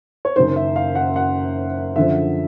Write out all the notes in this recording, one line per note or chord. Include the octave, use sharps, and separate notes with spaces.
C#5
F#1 F#2 D#3 C5
E5
F5
F#5
F#5
F#2 D3 F3 E5